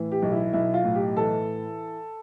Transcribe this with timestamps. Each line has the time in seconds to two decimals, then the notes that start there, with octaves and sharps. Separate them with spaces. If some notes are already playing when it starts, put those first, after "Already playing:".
Already playing: A2 E3
0.12 G4
0.22 B1
0.32 E4
0.53 B1 E4
0.74 F4
0.84 A2
0.95 G4
1.17 E3 A4